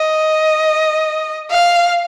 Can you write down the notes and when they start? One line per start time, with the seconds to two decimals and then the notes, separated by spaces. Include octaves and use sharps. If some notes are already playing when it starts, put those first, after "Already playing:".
Already playing: D#5
1.51 F5